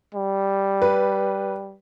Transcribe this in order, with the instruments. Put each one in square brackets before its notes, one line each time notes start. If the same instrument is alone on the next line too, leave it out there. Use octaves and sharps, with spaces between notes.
[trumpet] G3
[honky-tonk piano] B4